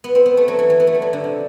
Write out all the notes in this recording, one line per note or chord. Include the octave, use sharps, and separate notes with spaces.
B3
C4
B3
A3
F#3
E3
E3
B3
A3
G3
F#3
D3
C3